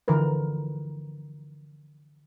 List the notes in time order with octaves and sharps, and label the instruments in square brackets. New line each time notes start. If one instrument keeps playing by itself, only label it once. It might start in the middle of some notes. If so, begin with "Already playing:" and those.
[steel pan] D3 E3 F3 A#4 B4